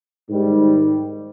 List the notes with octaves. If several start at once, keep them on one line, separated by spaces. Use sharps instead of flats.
G#2 D#3 G3